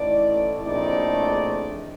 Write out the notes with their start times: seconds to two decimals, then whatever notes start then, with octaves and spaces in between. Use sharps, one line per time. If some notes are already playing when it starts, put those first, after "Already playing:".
Already playing: A1 A2 A3 D#4 D5
0.62 A#1 A2 A3 C4 D#4 D5